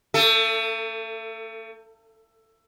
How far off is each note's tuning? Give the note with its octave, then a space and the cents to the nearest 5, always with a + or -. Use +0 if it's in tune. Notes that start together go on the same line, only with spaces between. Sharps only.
A3 +40 A4 +15